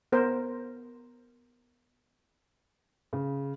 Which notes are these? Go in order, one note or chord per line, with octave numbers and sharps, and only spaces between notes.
B3 A#4 C5
C#3